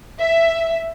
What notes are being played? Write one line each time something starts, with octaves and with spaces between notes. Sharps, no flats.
E5